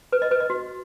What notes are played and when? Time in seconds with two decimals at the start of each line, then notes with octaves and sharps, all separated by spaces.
0.12 B4
0.22 D#5
0.31 B4
0.40 D#5
0.50 F#4